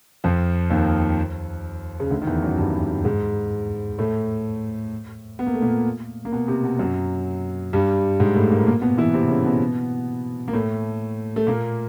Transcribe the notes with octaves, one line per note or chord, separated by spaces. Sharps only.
F2 F3
D#2 D#3
C#3
D2 D3
D#3
E2 E3
F#2 F#3
G2 G3
G#2 G#3
A2 A3
B3
A#3
A3
A#2 A#3
A#3
B2 B3
C3 C4
B2 B3
F#2 F#3
G2 G3
G#2 G#3
A2 A3
A#2 A#3
A#2 A#3
B2 B3
E3 E4
C3 C4
C#3 C#4
B2 B3
A#3
A2 A3
A3
A#2 A#3